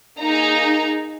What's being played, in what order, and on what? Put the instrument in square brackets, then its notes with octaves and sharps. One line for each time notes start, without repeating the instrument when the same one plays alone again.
[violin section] A#3 D#4 G#4 A#5